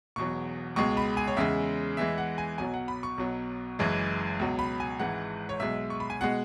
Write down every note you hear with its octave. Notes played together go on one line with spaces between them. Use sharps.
E1 E2 B2 F#3 C#6
C#2 B2 G#3 C#6
B5
G#5
C#5
E2 C#3 G#3 E5
E2 E3 G#3 E5
F#5
G#5
B1 B2 F#3 G#5
F#5
B5
C#6
B1 B2 F#3
F#1 F#2 E3 G#3
C#2 B2 F#3
B5
G#5
G#1 G#2 E3 G#3 F#5
C#5
B1 B2 G#3 E5
C#6
B5
G#5
B2 G#3 F#5